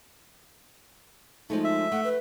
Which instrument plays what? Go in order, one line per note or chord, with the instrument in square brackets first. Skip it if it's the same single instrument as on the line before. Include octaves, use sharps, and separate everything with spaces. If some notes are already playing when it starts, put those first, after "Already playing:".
[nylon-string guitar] F3 G#3 A3 [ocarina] D#4
[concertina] E5
[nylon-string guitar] A3 [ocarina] F#5
[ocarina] B4